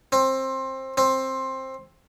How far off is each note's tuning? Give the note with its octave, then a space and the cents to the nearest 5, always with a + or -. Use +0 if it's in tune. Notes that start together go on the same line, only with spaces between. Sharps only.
C4 +20
C4 +15